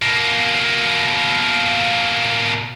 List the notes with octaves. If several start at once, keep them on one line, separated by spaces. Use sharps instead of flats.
B2 A#3